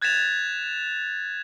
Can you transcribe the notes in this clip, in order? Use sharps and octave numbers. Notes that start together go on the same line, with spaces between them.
F#6 G#6 A6 B6 E7 F7